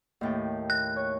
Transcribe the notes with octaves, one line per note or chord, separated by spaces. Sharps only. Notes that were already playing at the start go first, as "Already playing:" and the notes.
D#2 A2 G5
F#6
C#5